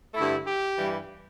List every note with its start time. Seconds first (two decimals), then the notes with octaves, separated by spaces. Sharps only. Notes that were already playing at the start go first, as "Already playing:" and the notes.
0.14 G2 D3 A3 E4
0.45 G4
0.77 G2 E3 G3